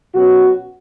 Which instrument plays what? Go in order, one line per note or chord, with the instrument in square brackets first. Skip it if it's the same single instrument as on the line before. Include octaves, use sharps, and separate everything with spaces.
[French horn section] B2 F#3 C#4 F#4